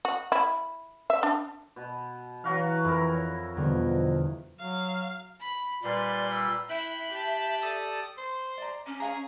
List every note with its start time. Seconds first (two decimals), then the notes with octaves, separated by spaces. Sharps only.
0.05 F#4
0.32 E4
1.10 E5
1.23 D4
1.76 B2
2.44 E3 F#3 F#4 F5
2.85 F2 E4 A#4
3.14 C#5
3.57 E2 B2 D3 F3 G3
4.59 F#3 F5
5.40 B5
5.83 A#2 G3 B4 D5 C6
6.31 E6
6.69 E4 E5 G5 B5 F#6
7.10 G4 A5
7.62 A4 D5 D#6
8.18 C5
8.58 D5 A#5
8.87 C#4 D6
9.00 G#4 C#5 F5 A#5